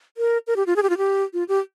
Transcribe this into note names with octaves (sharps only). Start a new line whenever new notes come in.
A#4
A#4
G4
F4
G#4
G4
F4
G4
F4
G4